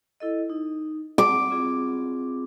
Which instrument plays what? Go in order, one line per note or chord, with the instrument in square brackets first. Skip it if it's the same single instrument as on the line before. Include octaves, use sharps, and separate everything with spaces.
[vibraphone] E4 A4 D#5
D#4
[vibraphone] C4 [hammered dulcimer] D6
[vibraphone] C4 F4 G#4